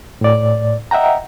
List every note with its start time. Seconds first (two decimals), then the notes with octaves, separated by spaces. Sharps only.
0.21 A2 D5
0.91 D#5 E5 F#5 G5 A#5